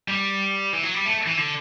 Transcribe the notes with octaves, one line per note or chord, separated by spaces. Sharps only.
G3
E3
F#3
G3
A3
E3
D3